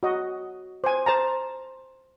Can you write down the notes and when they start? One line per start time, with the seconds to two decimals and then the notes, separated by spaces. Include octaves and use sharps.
0.03 F#4 D#5
0.84 C5 G#5
1.06 C5 A5 A#5